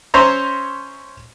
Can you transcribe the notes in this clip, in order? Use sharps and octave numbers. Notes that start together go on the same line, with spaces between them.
C#4 C5 C#5 E5 A#5 C6